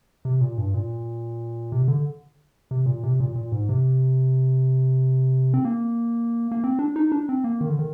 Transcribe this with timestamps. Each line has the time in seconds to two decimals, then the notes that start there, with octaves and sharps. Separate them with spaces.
0.25 C3
0.41 A#2
0.57 G2
0.74 A#2
1.72 C3
1.88 D3
2.71 C3
2.86 A#2
3.03 C3
3.20 A#2
3.36 A#2
3.52 G#2
3.69 C3
5.54 C4
5.65 A#3
6.51 A#3
6.64 C4
6.79 D4
6.96 D#4
7.12 D4
7.29 C4
7.44 A#3
7.61 D#3
7.70 D3
7.79 D#3